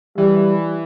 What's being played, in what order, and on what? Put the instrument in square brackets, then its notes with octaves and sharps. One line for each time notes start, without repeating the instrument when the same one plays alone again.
[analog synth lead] E3 [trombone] G3